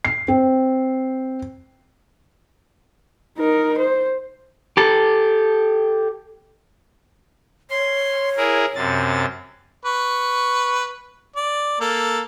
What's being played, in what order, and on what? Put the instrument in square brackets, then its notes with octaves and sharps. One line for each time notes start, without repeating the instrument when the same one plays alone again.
[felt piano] C7
C4
[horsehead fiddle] D#4 A#4
C5
[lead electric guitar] G4 A4
[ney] C#5 [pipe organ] C6
[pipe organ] E4 G#4 A#4
F#2 C3 A6
[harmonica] B4 C#6
D5
A#3 A4